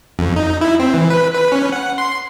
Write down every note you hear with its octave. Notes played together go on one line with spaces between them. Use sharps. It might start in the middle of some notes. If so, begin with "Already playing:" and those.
F2
D#4
E4
C4
E3
B4
B4
C#4
F#5
C6